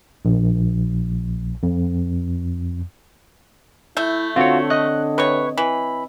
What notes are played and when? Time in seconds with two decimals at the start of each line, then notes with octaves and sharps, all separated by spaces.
0.25 A#1
1.63 F2
3.97 A3 E4 E5 G6
4.36 D3 C4 F4 F#4 C#5
4.70 D#5 F#6
5.18 C3 B4 C#5 C#6
5.58 E3 B5